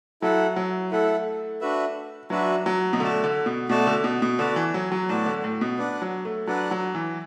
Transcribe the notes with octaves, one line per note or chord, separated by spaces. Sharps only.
F#3 E4 A4 F#5
F#3
A3 E4 A4 F#5
D4 F#4 B4 E5
F#3 D4 F#4 B4 E5
F#3
B2
D3 A3 F#4 D5 A5
D3
B2
B2 A3 F#4 D5 A5
D3
B2
B2
D3 B3 F#4 D5 A5
E3
F#3
F#3
A2 B3 F#4 D5 A5
D3
A2
B2
D4 B4 D5 F#5
F#3
A3
F#3 D4 B4 D5 F#5
F#3
E3